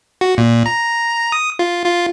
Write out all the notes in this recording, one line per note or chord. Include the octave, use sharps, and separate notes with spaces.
F#4
A#2
A#5
D#6
F4
F4